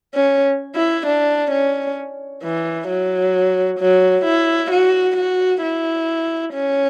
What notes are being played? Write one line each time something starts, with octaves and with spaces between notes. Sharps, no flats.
C#4
E4
D4
C#4
E3
F#3
F#3
E4
F#4
F#4
E4
C#4